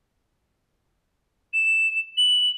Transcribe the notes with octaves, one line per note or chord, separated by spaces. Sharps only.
E7
F#7